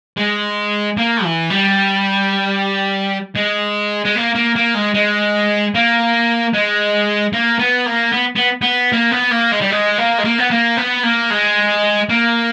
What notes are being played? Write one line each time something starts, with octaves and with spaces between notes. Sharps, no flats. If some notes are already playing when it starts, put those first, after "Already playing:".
G#3
A#3
E3
G3
G#3
G#3
A#3
A#3
A#3
G#3
G#3
A#3
G#3
A#3
B3
A#3
B3
B3
B3
A#3
B3
A#3
G#3
G3
G#3
A#3
G#3
A#3
B3
A#3
B3
A#3
G#3
A#3